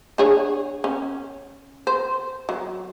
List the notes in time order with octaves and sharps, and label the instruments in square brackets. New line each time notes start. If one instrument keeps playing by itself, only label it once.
[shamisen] D4 G#4 C#5
C#4
C5
F#3